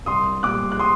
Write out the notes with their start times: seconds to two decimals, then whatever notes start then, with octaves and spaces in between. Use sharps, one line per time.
0.06 C2 C6 D#6
0.43 A#2 G3 D6 F#6
0.72 F#6
0.79 C6 D#6